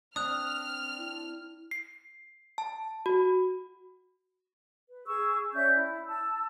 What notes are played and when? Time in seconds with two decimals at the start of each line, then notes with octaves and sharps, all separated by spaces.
0.16 C4 D4 D#6 F6 F#6
0.98 E4
1.71 C7
2.58 A5
3.06 F#4
4.89 B4
5.06 G#4 C#6 E6
5.54 C#4 D5 E5 G6
5.76 E4
6.07 A5 E6